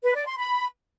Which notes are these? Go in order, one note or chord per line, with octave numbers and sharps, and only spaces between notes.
B4
D5
C6
B5